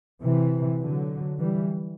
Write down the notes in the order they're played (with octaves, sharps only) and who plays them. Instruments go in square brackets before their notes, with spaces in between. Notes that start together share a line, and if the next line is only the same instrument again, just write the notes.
[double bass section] C3 E3
D3 F#3
E3 G3